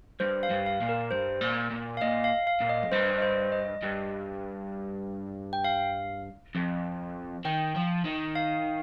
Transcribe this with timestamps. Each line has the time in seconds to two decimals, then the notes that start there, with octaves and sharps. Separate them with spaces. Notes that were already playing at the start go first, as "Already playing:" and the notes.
0.20 G2 C5
0.43 F5
0.50 G2
0.66 F5
0.81 A#2
0.89 A#4
1.11 G2 C5
1.41 A#2
1.71 A#2
1.97 F5
2.01 A#2 D#5
2.24 F5
2.47 F5
2.61 A#2
2.69 D#5
2.84 F2
2.92 G2 C5
3.18 D#5
3.22 C5
3.52 D#5
3.82 G2
5.53 G5
5.64 F5
6.55 F2
7.45 D#3 G5
7.76 F3
8.05 D#3
8.35 F5